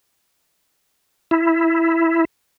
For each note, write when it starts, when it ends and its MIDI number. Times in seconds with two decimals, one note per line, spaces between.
1.31 2.25 64